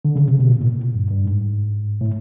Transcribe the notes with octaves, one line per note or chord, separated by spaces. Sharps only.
D3
C#3
C3
B2
A#2
A2
A#2
G2
G2
G#2
A2